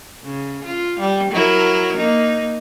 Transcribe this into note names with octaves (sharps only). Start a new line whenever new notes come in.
C#3
F4
G3
F#3 E4 A#4
A#3 D#4